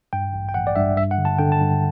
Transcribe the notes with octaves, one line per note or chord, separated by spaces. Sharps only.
G2 G5
A1
G5
A1 F#5
D5
G2 E5
G2 E5
F#5
D3
A5
D3 G5
A5
G2